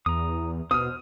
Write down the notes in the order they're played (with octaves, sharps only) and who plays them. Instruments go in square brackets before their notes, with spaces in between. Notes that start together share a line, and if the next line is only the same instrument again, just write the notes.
[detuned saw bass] E2 [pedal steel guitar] A#5 D#6
[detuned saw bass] B2 [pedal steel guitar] C5 F6 [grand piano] D#6